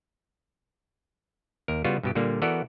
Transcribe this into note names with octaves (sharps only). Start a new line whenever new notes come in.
D#2 A#4
C#3 G3 B3 F4 F#4
G2 B2 G4
A#2 D3 G3 A#3
E3 B3 F#4 A4 A#4 D5